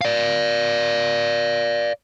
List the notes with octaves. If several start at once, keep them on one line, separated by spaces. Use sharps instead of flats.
D5 F5